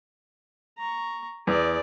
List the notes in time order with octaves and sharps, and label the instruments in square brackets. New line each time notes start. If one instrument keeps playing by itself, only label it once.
[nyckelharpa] A#5 C#6
[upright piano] E2 [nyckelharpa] G#4 D5